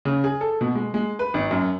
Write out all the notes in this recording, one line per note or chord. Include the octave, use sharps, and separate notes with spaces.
C#3
G#4
A4
B2
G#3
G#3
B4
G#1
F#2